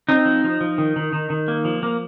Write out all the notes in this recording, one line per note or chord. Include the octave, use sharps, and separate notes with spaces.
C4 D#4
F3
F3
F3
D#3
D#3
D#3
D#3
A#3
F3
A#3